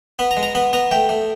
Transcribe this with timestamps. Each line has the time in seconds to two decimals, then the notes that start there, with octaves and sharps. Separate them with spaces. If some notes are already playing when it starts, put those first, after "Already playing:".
0.19 B3 B5
0.31 A#5
0.37 G#3
0.43 A#5
0.55 B3 B5
0.73 B3 A#5
0.91 A3 G5
1.09 A3